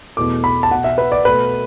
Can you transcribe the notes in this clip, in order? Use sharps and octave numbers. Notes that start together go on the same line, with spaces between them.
E2 B2 A3 D6
B5
A5
B2 B3 F#5
E5
B4
D5
B2 A3 B4